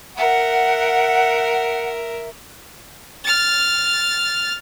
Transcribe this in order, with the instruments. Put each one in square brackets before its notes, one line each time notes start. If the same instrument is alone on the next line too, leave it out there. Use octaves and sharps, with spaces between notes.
[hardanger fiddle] A#4 E5 [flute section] F#5
[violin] F6 A6